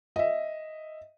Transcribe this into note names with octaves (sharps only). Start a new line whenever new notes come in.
D#5 E5